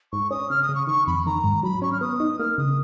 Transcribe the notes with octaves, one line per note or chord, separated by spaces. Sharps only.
G#2 C#6
C#4 D#6
C#3 F6
D#6
C#3
C#6
D#3 C#6
F2 B5
D#3 A#5
G#2
F#3 B5
C#4 C#6
F6
B3 D#6
D#4
A#3 F6
C#3 D#6